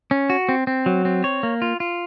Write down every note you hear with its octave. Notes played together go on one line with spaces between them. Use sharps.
C#4
F#4
C4
C4
F#3
C4
C#5
A#3
F4
F4